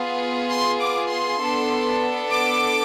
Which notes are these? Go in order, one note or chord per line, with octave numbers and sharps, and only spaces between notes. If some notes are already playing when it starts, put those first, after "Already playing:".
Already playing: B3 F4 G#4
C6
D6
C6
B3 D4 A4
D6